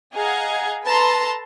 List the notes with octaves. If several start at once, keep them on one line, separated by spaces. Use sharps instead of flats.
G#4 D#5 F5 F#5 A#5 G#6
A4 B4 A5 A#5 C6